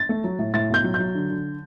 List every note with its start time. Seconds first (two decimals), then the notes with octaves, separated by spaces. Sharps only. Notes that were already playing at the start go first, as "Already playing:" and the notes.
Already playing: A6
0.09 A3
0.24 F#3
0.39 A2
0.54 A2 A6
0.69 B1 G6
0.84 F#3
0.94 G6
0.99 F#3
1.15 D3
1.29 D3